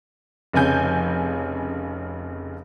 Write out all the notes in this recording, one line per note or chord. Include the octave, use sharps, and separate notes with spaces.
F1 F2 C#3 G#5 G6